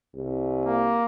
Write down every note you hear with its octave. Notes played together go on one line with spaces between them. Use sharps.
C2
A#3